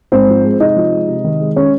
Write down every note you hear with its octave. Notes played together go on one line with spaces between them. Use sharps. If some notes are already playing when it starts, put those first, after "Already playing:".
G#2 C4 C5
F3
G#3
C3 D#4 D#5
F3
G#3
C3
D#3
G#3
C#4 C#5